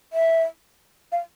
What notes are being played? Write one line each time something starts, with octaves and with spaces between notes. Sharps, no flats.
E5
F5